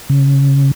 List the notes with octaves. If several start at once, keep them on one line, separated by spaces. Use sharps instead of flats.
C#3